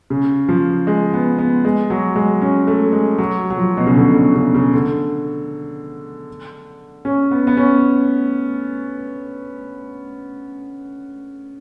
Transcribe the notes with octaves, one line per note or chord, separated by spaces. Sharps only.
C#3
F3
G#3
B3
B3
G#3
F#3
G#3
C#4
A3
G#3
F#3
F#3
F3
B2
C#3
D3
C#3
C#3
C#3
D3
C#4
B3
B3
C#4